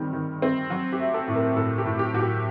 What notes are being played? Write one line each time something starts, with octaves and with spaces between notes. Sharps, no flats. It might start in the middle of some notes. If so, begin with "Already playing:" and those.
Already playing: D#3 G3 C4
D#3
C4
F#3 F#4
G4
A3
A4
A2
A#4
A2 A4
G4
A2
G4
A2 F#4
G4